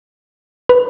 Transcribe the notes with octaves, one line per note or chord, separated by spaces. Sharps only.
B4